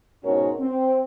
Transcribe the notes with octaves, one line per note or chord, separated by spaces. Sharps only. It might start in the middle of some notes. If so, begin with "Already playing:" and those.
G#2 B2 C#4 F#4 A#4 C#5
C4